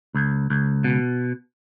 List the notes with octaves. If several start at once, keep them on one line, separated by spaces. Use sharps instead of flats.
C#2
C#2
B2